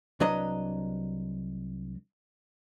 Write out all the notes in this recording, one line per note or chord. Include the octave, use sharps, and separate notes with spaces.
C2 F#3 D4 B4 D#5 A#5